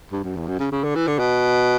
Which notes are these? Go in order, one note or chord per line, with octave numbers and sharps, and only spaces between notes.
G2
F#2
E2
F#2
C#3
C#3
D3
E3
D3
B2